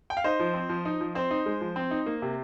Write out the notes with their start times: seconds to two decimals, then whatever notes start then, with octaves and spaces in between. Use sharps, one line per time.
0.10 G5
0.17 F5
0.24 D#4 C5 D#5
0.40 F3
0.54 C4
0.69 F3
0.85 D#4
1.01 F3
1.15 C4 C5
1.31 D#4
1.46 G#3
1.61 F3
1.76 C4
1.91 D#4
2.06 A#3
2.22 C3